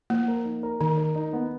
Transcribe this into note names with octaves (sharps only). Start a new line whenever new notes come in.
F3 A#3
A#4
D#4
A#4
D#3 D#4
A#4
D#4
B3